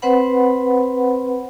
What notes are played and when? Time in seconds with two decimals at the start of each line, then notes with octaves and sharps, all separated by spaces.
0.02 C4 B4 C5 F#5 B5